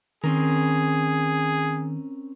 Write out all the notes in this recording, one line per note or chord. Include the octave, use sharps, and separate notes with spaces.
D#3 C4 C#4 G#4 A#4